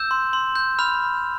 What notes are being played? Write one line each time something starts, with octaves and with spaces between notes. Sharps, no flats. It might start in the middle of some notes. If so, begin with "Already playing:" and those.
Already playing: E6 G6 E7
C6
C6
G6
B5 F6 F7